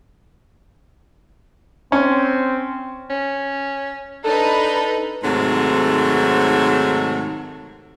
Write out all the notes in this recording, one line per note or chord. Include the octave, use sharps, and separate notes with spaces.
C4 C#4
C#4
D4 D#4 A4 B4
G#2 C3 D#3 F#3 A3